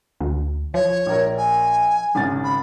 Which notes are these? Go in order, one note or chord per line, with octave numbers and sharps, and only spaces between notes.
D2
F3 C#5
A#1 A#4
G#5
G#1 C#3 A6
B5